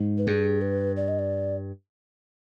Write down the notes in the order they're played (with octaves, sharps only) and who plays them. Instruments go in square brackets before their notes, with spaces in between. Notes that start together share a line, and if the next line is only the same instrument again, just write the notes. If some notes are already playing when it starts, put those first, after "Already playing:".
Already playing: [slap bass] G#2
[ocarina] B4
[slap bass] G2 [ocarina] G#4
[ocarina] B4
D5
D#5
D5